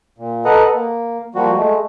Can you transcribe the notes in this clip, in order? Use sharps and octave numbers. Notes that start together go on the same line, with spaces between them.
A#2
A4 B4 D#5 F#5 A#5
A#3
F3 G3 A#3 F#4
G#3 A3